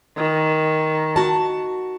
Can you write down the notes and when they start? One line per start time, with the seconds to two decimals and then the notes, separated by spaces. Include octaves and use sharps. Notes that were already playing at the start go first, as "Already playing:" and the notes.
0.17 D#3
1.16 F#4 A5